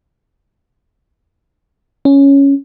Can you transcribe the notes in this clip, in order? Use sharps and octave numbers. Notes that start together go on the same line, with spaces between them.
C#4